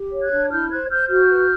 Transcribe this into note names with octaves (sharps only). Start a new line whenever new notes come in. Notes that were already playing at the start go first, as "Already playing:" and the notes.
Already playing: G4
C#5
F#6 G#6
D4
E4 F6 G6
C5 F#6 G#6
C5 F6 G6
F#4 F6 G6
B4